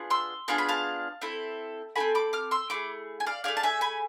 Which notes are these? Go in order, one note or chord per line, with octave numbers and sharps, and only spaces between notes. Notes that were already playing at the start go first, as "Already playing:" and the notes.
Already playing: B3 D4 F4 G#4
C6 E6
B3 D4 F4 G#4 A5
B5
F5 A5
C4 E4 A4
C4 E4 A4 G#5 B5
B5 D6
D6 F6
C6 E6
A3 E4 G#4 B5 D6
G#5
D5 F5
A3 E4 G#4 D5 F5
A5
E5 G#5
G#5 B5